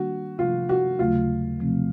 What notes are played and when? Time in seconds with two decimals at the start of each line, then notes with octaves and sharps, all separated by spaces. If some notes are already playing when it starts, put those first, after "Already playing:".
Already playing: D#3 G3 A#3 D4 F#4
0.38 C3 F3 A3 F4
0.69 F#4
0.99 D#2 C#3 F#3 A3 F4
1.60 C3 F3 A3 C4